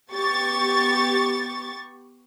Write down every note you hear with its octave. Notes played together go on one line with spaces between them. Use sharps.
B3 G4 C#6 A6